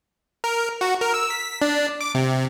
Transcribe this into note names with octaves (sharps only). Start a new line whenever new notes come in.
A#4
F#4
A#4
E6
B6
D4
D6
C3